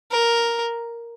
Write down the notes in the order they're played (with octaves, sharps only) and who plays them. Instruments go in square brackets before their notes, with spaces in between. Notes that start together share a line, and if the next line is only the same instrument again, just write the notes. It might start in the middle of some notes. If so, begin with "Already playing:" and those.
[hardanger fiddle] A#4